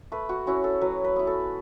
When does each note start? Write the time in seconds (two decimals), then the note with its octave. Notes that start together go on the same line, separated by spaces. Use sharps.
0.12 A3 B4
0.29 F#4
0.47 C#4 E4 F#4
0.64 A4
0.81 F#3 B4
1.04 B4
1.16 B3 E4
1.27 A4